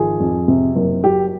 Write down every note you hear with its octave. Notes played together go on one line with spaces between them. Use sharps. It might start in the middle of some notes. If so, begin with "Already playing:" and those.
Already playing: G#1 F3 G#4
F2
C3
F#1
F#3 G4